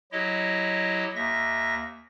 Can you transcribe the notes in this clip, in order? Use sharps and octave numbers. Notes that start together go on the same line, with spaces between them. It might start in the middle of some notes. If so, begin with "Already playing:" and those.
F#3 E4 G4 D#5
D#2 E5 A#6